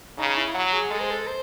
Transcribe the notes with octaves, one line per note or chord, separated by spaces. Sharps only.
C#3 D#4
E4
F#3 F#4
G#4
G#3 A4
C5
A4
C5